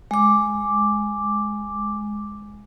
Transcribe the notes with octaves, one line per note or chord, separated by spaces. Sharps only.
G#3 D6